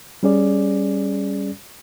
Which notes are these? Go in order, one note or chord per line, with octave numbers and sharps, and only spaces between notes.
G3 C#4 G#4 D5